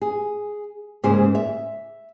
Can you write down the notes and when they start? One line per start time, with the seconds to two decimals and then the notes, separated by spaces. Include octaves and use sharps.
0.01 G#4
1.03 G#2 C#3 A#3 G#4 C5
1.35 E5